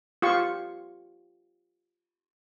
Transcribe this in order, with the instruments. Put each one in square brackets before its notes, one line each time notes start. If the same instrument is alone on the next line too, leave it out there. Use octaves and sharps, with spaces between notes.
[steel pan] F4 G4 C#6